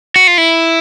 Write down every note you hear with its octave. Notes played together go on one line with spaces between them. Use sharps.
F#4
F4
E4